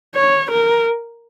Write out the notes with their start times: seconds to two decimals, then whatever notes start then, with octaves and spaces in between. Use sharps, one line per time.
0.15 C#5
0.51 A#4